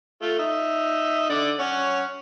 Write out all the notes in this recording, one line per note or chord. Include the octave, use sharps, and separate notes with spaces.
A3 F4
D#4 E5
D3 D5
C#4 C#5 F#5